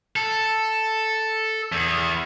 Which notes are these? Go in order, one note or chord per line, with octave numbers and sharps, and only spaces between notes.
A4
E2